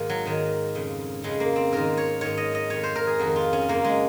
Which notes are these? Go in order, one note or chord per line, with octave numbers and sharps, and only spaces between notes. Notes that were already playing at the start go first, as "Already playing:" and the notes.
Already playing: G#2 D#3 A#3
F#3
G#2 D#3
F2 C#3
F2 C#3 G#3
A#3
C4
G#2 D#3 A#4
C#5
G#2 D#3 C#5
D#5
D#5
F2 D#3 C#5
C5
A#4
G#4
F2 D#3 F#4
F4
C#4
F#2 C#3 A#3
G#3